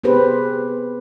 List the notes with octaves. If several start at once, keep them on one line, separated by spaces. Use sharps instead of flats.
B3 C4 G4 G#4 B4 C5